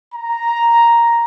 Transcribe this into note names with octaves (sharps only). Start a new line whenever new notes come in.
A#5